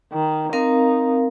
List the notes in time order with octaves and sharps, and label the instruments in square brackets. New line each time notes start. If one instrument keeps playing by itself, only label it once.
[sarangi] D#3
[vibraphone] C4 A#4 F5 [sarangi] D#4